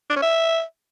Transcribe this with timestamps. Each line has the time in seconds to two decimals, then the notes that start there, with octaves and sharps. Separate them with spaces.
0.10 D4
0.16 C#4
0.22 E5